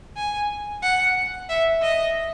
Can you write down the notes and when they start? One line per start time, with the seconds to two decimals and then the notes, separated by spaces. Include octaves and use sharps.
0.17 G#5
0.83 F#5
1.49 E5
1.82 D#5